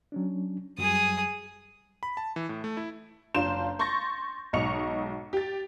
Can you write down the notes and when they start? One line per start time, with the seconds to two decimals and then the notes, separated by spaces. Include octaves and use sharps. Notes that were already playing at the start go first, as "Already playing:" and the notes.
0.12 F#3 C#4 D4
0.78 F#2 F#3 G3 G#4 D#6
2.03 B5
2.17 A5
2.36 E3
2.49 A2
2.64 A3
2.77 E4
3.34 F#1 D4 F4 C6 G6 E7
3.79 C6 C#6 G6 A6 A#6
4.53 B1 G#2 D#5 C#6 C#7 F7
5.33 G4 A6